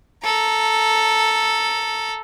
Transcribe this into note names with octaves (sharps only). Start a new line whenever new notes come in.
A4 A#5